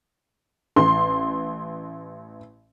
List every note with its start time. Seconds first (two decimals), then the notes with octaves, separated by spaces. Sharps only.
0.76 A1 C6